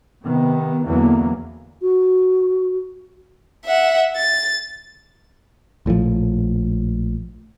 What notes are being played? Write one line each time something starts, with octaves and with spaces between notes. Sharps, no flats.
C3 D#3 B3
E2 D3 E3 F#3 A#3
F#4
E5 F#5
A6
A#1 A2 D#3 F3